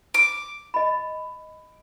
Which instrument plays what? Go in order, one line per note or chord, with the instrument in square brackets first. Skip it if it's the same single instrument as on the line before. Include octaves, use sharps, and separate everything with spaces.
[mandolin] D6
[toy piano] D#5 B5